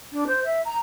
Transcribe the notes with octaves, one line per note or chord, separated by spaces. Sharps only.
D4
C5
E5
A#5